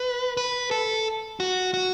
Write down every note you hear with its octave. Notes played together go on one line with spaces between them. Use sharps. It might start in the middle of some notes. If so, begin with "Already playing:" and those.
Already playing: B4
B4
A4
F#4
F#4